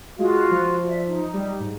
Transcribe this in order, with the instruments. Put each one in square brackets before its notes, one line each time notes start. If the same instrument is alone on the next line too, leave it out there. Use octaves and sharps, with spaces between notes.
[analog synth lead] G#3 [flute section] F4 F#4 F5
[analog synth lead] F3
[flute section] D5 E5
D#4
[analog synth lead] G3
G#2